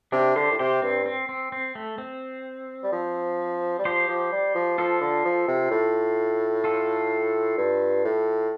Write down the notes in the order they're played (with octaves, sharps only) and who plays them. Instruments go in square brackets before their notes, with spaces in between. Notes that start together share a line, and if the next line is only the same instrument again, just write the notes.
[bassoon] C3 [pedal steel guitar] D4 G4
[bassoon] D3 [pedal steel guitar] G4 C5
[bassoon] A2
[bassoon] C3 [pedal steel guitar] G4 C5
[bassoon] G2 [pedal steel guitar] C4
[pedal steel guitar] C4
C4
C4
A3
C4
[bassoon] G3
F3
G3
[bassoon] F3 [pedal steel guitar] G4 C5
[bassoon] F3
G3
F3
[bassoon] F3 [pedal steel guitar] F4 A4
[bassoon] D3
F3
C3
A2
[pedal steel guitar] F4 A4
[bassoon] G2
A2